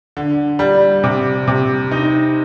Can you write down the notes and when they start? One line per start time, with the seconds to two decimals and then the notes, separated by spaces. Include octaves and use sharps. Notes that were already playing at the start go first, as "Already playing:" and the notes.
0.17 D3
0.59 G3
1.04 C3
1.47 C3
1.91 D#4